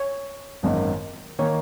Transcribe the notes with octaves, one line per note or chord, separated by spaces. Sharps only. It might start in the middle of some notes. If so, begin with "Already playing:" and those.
Already playing: C#5
G#1 F#2 D#3 A#3 D#4
D#3 A#3 D#4 C#5